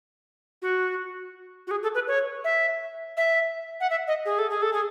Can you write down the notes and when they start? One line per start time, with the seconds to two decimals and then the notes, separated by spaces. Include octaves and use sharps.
0.62 F#4
1.67 F#4
1.71 G#4
1.83 A4
1.95 B4
2.07 C#5
2.44 E5
3.17 E5
3.80 F#5
3.90 E5
4.08 D#5
4.26 G#4
4.39 A4
4.50 G#4
4.62 A4
4.73 G#4